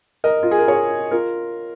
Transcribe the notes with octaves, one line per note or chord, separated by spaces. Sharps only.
A#4 D#5
F4
G#4
A#4
G#4 C#5
F4 A#4